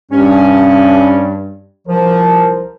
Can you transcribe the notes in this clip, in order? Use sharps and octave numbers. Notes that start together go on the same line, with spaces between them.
G2 C#4
C2 F3 A#4 C5